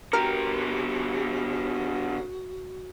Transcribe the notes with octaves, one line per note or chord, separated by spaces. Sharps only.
D3 F#4 G4 A#4